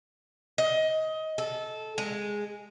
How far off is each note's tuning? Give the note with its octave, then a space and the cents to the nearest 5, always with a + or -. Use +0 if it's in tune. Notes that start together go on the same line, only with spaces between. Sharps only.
D#5 +20
A4 -15
G#3 -5